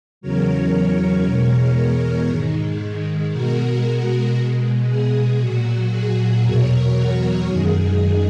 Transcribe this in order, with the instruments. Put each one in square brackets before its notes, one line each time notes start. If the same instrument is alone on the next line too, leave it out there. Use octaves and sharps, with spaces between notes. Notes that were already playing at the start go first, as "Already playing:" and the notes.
[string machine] E2 C#3 F#3 A#4 C#5
A#4 C#5
E2 B2 G#3 A#4 C#5
A#4 C#5
G#2 D#3 G#3
B2 G#3 F#4 A#4
F#4 A#4
B2 G#3
G#4
A#2 F#3 F#4
G#4
E2 B2 F#3 A#4 C#5
F#4
F#2 D#3 G#3 G#4